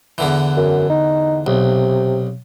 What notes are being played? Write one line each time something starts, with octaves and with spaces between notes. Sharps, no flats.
E2 D3 E3
F#2
D#4
B1 C3